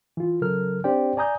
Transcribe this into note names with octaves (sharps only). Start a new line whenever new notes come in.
E3 F4
C#3 F#3 A4 A#4 F6
C4 D4 G4 C5 D5 G5
D5 G#5 A#5 D#6 G6